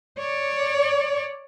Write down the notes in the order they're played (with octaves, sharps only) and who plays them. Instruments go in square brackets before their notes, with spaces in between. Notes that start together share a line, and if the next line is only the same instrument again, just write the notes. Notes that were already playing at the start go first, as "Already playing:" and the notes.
[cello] C#5 D5